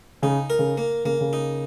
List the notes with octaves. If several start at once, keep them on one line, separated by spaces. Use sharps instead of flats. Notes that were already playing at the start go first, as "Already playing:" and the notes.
C#3 D#4
A#4
C#3
A#3
C#3 A#3
C#3
D#4